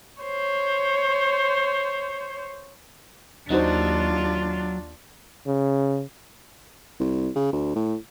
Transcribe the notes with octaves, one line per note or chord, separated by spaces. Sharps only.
C5 C#5
D#2 F#3 D4 D#4 F4 F#4 C5
C#3
C2
C#3
D2
A2